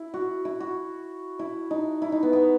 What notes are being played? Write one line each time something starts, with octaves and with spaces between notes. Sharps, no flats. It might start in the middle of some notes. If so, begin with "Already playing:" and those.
Already playing: E4
F#4
E4
F#4
E4
D#4
E4
D#4
B3
B3